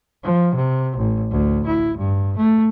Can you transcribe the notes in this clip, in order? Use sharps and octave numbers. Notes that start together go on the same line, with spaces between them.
F3
C3
A1
D2
E4
G2
A3